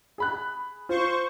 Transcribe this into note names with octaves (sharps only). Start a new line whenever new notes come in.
G#4 B5 F#6
F4 C5 C#6